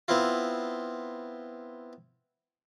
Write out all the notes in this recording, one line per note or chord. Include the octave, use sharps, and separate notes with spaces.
B3 C4 E4 F4